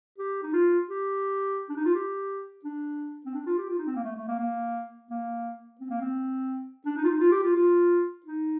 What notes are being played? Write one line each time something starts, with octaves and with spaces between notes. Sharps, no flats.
G4
D#4
F4
G4
D4
D#4
F4
G4
D4
C4
D4
F4
G4
F4
D#4
C4
A#3
A3
A3
A#3
A#3
A#3
C4
A#3
C4
D4
D#4
F4
D#4
F4
G4
F4
F4
D#4